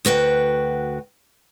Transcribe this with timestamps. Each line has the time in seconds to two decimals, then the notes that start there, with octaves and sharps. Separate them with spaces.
0.05 D2 F#4 B4 G5